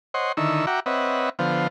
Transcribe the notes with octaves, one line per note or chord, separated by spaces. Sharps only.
C5 C#5 D#5 F#5 C6
D3 D#3 D#4 E4 C#6 E6
F#4 E5 F#5 G5 A#5 D6
C4 B4 C#5 D#5 E5 F#5
D3 F3 B3 C5 F5